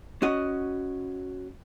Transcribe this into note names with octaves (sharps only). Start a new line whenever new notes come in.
C#4 F#4 D#5